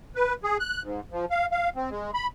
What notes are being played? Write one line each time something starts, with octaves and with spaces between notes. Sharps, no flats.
B4
G#4
F#6
G#2
F3
F5
F5
C4
G#3
B5